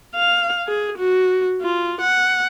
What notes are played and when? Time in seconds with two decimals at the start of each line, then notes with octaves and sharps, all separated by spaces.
0.15 F5
0.67 G#4
0.97 F#4
1.62 F4
2.00 F#5